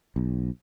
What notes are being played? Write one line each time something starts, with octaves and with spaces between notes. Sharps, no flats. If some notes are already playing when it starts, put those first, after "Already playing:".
B1